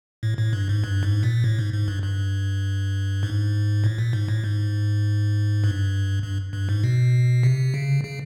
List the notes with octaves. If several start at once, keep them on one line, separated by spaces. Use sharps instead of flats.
A2
A2
G2
G#2
G2
G#2
A#2
A2
G#2
G#2
G2
G2
G#2
A2
A#2
G#2
A2
G#2
G2
G2
G2
G#2
B2
C3
C#3
C#3